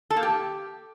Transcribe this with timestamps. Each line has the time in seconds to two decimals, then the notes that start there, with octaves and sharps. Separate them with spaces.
0.10 A4
0.17 A#3
0.23 G4